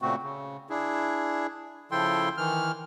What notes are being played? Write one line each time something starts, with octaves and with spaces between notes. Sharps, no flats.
A#2 C#3 A3 C4 F#4
C#3
D4 E4 G#4
C#3 F3 E4 A4 G5 C6
D#3 E3 F6